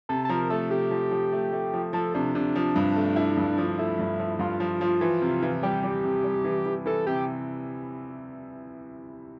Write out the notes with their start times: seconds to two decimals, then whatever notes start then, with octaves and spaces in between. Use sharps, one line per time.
0.09 C3 A4
0.25 A4
0.29 F3 A#4
0.50 A3 A4
0.70 C3 G4
0.91 F3
1.11 F3
1.32 A3
1.53 A3
1.73 F3
1.93 F3 A4
2.14 C3 D4
2.35 C3 D4
2.56 F3
2.76 G2
2.96 A3
3.16 E4
3.37 G2
3.58 F3
3.79 A3 E4
3.99 G2
4.19 F3
4.39 G2 F4
4.60 F3
4.81 F3
5.01 E3
5.22 C3
5.42 E3
5.63 G3 G4
5.83 G3
6.04 C3
6.24 G3
6.44 E3
6.65 E3
6.86 E3 A4
7.07 C3 G4